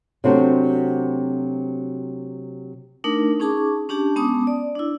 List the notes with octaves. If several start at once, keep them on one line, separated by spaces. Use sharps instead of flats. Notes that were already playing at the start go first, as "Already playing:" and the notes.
C3 F#3 A3 C4 D4 F#4
A3 D4 D#4 A#4
C#4 D#4 G#4 A5 C#6 D6
C#4 D4 G4 A5
G#3 B3 C#4 A5 D6 D#6
D5
D4 E4